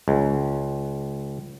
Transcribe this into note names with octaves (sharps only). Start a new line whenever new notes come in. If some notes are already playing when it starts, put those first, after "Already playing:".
C#2